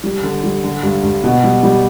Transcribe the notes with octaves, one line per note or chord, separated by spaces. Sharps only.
G3
D3
G3
D3
G2
G2
B2
G3
G3